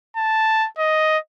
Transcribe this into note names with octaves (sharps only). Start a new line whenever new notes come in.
A5
D#5